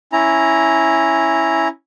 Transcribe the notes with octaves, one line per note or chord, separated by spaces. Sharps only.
C#4 E4 A#5